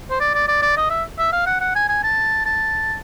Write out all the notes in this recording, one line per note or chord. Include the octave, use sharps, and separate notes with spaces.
C5
D5
D5
D5
D5
D#5
E5
E5
F5
F#5
F#5
G#5
G#5
A5
A5